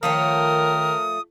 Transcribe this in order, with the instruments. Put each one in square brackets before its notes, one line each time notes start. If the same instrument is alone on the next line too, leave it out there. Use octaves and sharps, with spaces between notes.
[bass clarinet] D#3 [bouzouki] F3 A3 C#5 [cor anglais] A#4 [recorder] D#6